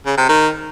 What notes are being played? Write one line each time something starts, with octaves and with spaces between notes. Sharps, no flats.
C#3
C3
D#3